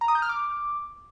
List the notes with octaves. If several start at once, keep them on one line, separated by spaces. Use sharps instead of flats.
A#5
D#6
G6
F6
D6